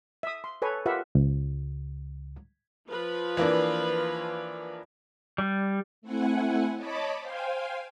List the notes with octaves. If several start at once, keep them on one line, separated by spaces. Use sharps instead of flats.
E5 D#6
C6
A4 B4 C#5 G#5
F4 G4 A#4 B4 E5 F#5
C#2
F3 F4 B4
E3 A#3 D4
G3
A3 C4 E4 F#5 G#5
C#5 D#5 A5 B5 D6
C5 F5 G5 G#5